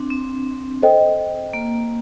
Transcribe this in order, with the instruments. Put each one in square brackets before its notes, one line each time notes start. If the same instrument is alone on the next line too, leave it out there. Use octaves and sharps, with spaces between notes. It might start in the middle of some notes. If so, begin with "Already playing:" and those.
Already playing: [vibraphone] C4 D4
C4
[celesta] A4 C5 D#5 G5
[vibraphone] A#3